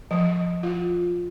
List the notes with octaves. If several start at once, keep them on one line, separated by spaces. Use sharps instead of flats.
F3
F4